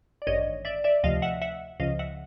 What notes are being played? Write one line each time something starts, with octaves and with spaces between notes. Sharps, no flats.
D5
A1 G2 D#3 C#5 D#5
D5 E5
D5 E5
D2 C3 F3 D#5 F5
E5 F#5
E5 F#5
C#2 C#3 F3 D#5 F5
E5 F#5